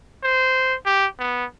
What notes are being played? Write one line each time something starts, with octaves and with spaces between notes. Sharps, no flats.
C5
G4
B3